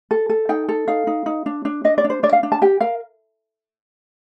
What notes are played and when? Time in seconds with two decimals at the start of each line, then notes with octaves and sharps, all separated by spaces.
0.11 A4
0.30 A4
0.49 D#4 G5
0.69 A4
0.88 D#4 F5
1.07 D#4
1.26 D#4
1.46 D4
1.65 D4
1.84 D4 D#5
1.98 D5
2.04 D4
2.10 C5
2.23 D4 D5
2.33 F5
2.43 D4
2.52 A5
2.62 G4 G5
2.81 A#4 F5